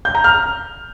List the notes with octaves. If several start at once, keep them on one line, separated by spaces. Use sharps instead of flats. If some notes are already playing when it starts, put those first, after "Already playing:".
G6
A#5
F6